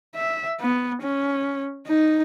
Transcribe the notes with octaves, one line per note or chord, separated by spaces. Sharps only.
E5
B3
C#4
D#4